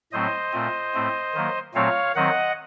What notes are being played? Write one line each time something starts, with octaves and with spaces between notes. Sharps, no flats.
A2 F#3 A3 C4 C5 D#5
A#2 A3 C4
A2 A3 C4
D#3 F#3 A#3
A#2 F#3 A3 C4 C#5 F5
D#3 F#3 C4 D#5 F#5